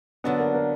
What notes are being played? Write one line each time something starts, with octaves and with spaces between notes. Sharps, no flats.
D3 F#3 B3 D4
A#3
A#3